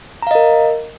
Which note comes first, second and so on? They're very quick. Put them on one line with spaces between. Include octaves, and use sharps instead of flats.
A#5 F5 D#5 A#4